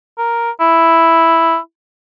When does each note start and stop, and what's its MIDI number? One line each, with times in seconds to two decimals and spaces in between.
0.18 0.50 70
0.60 1.57 64